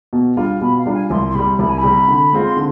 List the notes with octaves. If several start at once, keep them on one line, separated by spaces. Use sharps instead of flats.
B2
G3 D4 F4
B2 B5
F5
G3 D4 F4
G#5
C2 C6
C6
C3 G3 B5
C2 B5
G#5
B5
C3 G3
D3
G#3 C4 F4
C6
D3